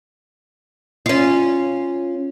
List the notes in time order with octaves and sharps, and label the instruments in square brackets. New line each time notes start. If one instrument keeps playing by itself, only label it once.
[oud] C#4 F4